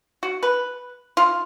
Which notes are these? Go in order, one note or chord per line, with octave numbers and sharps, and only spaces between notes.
F#4
B4
F4